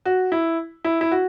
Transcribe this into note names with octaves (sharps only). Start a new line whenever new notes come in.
F#4
E4
E4
E4
F#4